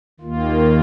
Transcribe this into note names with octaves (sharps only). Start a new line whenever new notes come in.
D#2 D#3 A#3 F4